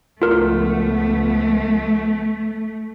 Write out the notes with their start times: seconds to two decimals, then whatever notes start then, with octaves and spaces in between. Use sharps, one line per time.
0.22 C#2 F3 A3 B3 F4 A#4